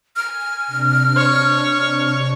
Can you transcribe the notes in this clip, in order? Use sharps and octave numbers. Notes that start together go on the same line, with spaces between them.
G#5 F6
C3 D4
C#5